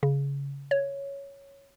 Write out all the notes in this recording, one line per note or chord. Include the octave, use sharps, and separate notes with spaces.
C#3
C#5